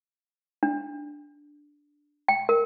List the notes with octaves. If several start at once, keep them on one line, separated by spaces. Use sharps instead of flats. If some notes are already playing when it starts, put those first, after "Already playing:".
D4
G5
A#4